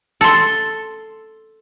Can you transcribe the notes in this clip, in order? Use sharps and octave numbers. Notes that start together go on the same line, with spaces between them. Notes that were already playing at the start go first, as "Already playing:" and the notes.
A4 C6